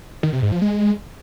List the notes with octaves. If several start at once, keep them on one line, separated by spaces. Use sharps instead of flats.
D#3
C3
G#2
F3
G#3